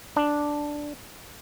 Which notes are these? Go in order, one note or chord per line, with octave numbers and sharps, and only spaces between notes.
D4